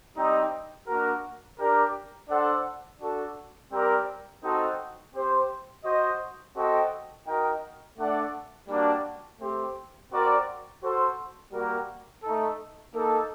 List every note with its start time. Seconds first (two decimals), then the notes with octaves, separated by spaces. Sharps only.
0.16 G3 C4 D#4
0.87 A#3 D4 F#4 A#4
1.58 D4 G4 A#4
2.29 D4 A4 C5 F#5
3.00 D4 F#4 A4
3.71 G3 C4 G4 A#4 D5
4.43 C4 D#4 F#4 A4
5.13 C4 G4 C5
5.84 F#4 C5 D#5
6.55 C4 F#4 A4 D#5 G5
7.26 D#4 F#4 A#4 D#5 G5
7.97 A3 D4 A4 D5 F#5
8.68 G3 A#3 D4 F#4
9.39 A3 C4 G4
10.10 C4 F#4 A#4 D5
10.82 F#4 A4 C5
11.52 G3 A#3 F#4 A#4
12.23 A3 D#4 A4
12.94 A#3 D#4 A4